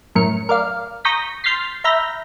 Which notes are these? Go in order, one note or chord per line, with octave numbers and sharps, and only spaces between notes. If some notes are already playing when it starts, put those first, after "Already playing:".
F#2 A2 A#4 C#7
A#4 D5 F5
A#5 C#6 D#6 G6 A#6 B6
C6 F6 G6 A6 B6 C7
E5 A#5 B5 F6 G6 A#6